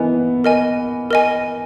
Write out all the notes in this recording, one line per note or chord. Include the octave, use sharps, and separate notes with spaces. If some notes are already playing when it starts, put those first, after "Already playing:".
Already playing: E3 B3 A#4 D#5 G#5
A#4 D#5 G#5
A#4 D#5 G#5